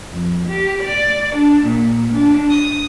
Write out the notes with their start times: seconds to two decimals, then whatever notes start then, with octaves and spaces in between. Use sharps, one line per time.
0.12 F2
0.48 G4
0.83 D5
1.36 D4
1.66 A#2
2.12 D4
2.50 D#6